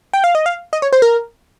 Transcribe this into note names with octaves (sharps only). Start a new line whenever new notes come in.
G5
F5
D#5
F5
D#5
C#5
C5
A#4